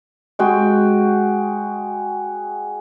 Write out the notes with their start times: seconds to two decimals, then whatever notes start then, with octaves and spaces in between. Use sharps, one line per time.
0.39 G#3 F#4 G5